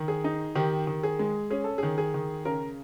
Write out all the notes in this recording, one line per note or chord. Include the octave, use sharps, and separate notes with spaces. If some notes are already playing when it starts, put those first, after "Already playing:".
Already playing: D#3
G#4
D#4
D#3 G4
D#3
G#4
G#3
C#4 G#4
A4
D#3 G#4
G#4
D#3
C#3 A#4